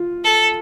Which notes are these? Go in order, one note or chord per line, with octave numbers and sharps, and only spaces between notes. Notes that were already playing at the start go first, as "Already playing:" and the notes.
Already playing: F4
A4